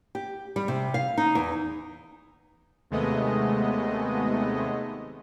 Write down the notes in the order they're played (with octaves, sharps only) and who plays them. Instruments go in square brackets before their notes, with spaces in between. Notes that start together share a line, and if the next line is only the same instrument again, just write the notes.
[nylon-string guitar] G4
G3
C3
F5
D#4
E2
[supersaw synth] D#2 C3 G#3 A3 B3 D#5